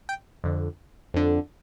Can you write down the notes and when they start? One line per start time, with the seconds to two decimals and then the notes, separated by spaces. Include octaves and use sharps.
0.09 G5
0.44 F2 D3
1.14 F2 D3